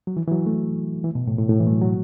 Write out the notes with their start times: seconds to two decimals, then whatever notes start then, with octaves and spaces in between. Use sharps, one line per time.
0.07 F#3
0.17 E3
0.27 E3
0.31 F#3
0.46 A3
1.04 E3
1.15 B2
1.27 A2
1.38 A2
1.50 A2
1.60 E3
1.67 A3
1.70 F#3
1.82 F#3